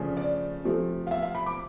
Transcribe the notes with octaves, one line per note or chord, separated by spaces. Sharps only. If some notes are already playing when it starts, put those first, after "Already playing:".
Already playing: C#3 F3 A3 D4
D5
C3 F3 A3
F5
E5
F5
B5
D6